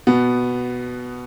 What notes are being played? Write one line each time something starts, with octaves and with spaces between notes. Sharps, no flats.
B2 B3